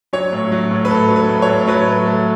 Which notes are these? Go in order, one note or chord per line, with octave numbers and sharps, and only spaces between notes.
F#3 C#5
A2
F#3
A2
B4
A2 A4
F#3
B4
A2
C#5
A2
F#3 B4
A3
A3